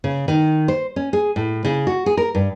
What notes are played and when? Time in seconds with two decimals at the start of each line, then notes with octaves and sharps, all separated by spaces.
0.04 C#3
0.28 D#3
0.68 C5
0.96 C#4
1.13 G#4
1.36 A2
1.65 C#3
1.87 F#4
2.06 G#4
2.17 A#4
2.35 G2